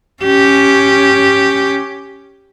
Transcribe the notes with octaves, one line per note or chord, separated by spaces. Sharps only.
C#4 G4